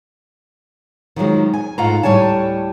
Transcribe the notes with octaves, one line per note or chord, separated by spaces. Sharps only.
D#3 F3 F#3 G#3
G#5
G#2 A3 F4 F5 F#5 A#5
D2 A2 G3 C#5 G#5 A5